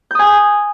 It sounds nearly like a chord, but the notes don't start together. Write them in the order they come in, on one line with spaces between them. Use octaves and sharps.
G6 D#6 G#5